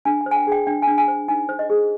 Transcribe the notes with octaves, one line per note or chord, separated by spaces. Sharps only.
D4 G#5
G#5
C5
G#5
G5
G#4 G5
D4 G5
D4 G#5
G#5
C5
D#4 G#5
C5
D#5
G#4